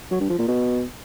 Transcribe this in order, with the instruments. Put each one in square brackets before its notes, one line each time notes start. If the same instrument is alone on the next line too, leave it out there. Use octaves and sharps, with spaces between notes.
[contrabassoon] F#3
G2
F3
A#2
B2